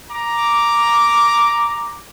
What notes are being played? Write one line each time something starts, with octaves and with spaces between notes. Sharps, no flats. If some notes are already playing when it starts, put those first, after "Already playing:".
A#5 D6